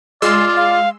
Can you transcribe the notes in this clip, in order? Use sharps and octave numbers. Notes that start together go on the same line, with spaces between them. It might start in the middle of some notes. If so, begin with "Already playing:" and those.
G#3 F4 D5 C6 E6
F5